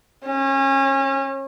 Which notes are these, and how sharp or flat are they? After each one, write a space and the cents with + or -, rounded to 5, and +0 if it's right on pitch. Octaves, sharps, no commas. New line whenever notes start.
C#4 -30